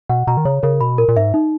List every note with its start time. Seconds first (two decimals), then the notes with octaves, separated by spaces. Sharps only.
0.09 B2 F#5
0.27 B2 A#5
0.37 D#3
0.45 C#3 C#5
0.63 C#3 A#4
0.81 B2 B5
0.98 A#2 A#4
1.08 A#2
1.17 G#2 E5
1.34 D#4